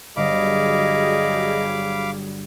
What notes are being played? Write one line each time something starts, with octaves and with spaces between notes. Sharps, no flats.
G1 F#3 G3 G#4 D#5 F5 B5 D6